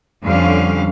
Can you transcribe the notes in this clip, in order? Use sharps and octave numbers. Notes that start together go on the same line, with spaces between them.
F2 D3 G3 C#4 F5